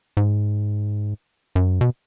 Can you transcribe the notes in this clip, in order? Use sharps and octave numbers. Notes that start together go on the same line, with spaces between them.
G#2
F#2
B2